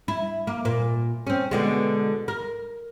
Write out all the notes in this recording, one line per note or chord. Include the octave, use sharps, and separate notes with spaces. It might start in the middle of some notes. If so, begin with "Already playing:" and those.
E4
A#3
A#2
C4 C#4
B2 D3 G#3
A#4